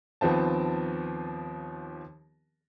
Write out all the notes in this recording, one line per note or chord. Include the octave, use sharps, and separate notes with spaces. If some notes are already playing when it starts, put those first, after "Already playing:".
D#2 F3 B3 C4 A5